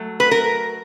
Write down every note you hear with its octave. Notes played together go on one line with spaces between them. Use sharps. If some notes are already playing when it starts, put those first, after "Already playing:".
Already playing: F#3 A3
B4
A#4